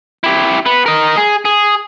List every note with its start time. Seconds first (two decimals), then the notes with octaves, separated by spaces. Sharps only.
0.24 E4 G4
0.66 B3 B4
0.86 A#4 D#5
1.17 G#4
1.45 G#4